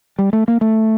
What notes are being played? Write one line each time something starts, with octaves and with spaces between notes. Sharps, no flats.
G3
A3
A#3
A3